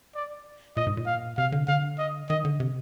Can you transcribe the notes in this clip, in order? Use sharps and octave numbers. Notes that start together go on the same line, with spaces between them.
D5
A#2 D#5
G#2
A#2
F5
C3 F5
D3
D3 F5
D#5
D#3 D#5
D3
C3